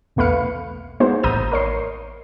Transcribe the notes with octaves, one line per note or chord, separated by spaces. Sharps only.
B1 E2 A3 B4 F5 C#7
G#3 A#3 B3 D#4 F#4 C5
A1 A#5 D#6 G6 D#7
A#4 C#5 C6